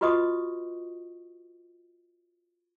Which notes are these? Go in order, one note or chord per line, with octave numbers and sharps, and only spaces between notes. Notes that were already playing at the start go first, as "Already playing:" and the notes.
F4 F#4 B4 D#5 C#6 D#6